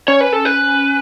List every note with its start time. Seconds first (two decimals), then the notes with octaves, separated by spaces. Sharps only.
0.08 C#4 C#5
0.21 B4
0.33 A4
0.45 B4